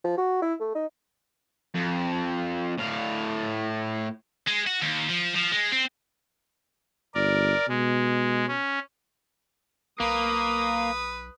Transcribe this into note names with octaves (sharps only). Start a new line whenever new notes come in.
F3
F#4
E4
A3
D#4
F2
A2 F5
G#3
F#4
D#2
F3
F3
G#3
C4
G1 A#4 D5
B2 G#3
C#4
B1 A#3 B4 D#6